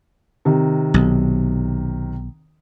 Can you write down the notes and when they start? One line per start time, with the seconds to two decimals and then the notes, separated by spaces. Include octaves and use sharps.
0.45 C3 D#3
0.94 B1